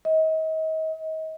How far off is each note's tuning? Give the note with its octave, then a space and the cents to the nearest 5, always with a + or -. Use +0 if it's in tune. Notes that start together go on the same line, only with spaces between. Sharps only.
D#5 +35